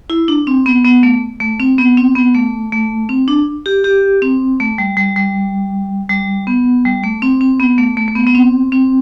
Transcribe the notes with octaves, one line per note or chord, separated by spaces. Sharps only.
E4
D4
C4
B3
B3
A3
A3
C4
B3
C4
B3
A3
A3
C4
D4
G4
G4
C4
A3
G3
G3
G3
G3
B3
G3
A3
C4
C4
B3
A3
A3
A3
B3
B3
C4
C4